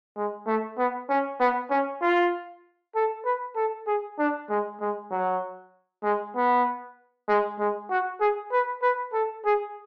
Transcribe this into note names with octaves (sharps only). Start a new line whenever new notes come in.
G#3
A3
B3
C#4
B3
C#4
F4
A4
B4
A4
G#4
D4
G#3
G#3
F#3
G#3
B3
G#3
G#3
F#4
G#4
B4
B4
A4
G#4